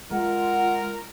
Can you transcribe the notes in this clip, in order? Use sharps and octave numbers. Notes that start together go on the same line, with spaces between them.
G#3 F4 A#4 F#5